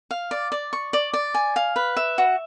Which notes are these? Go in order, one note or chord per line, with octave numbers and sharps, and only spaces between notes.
F5
D5
D5
C#6
D5
D5
G#5
F5
B4
E5
F#4